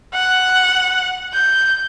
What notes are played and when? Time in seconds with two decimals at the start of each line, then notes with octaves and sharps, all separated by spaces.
0.14 F#5
1.34 G6